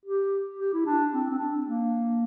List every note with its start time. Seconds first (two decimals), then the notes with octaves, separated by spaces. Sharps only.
0.06 G4
0.59 G4
0.73 E4
0.86 D4
1.13 C4
1.30 C4
1.39 D4
1.66 A#3